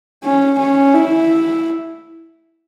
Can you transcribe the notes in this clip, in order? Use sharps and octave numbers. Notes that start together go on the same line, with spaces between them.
C#4
C#4
E4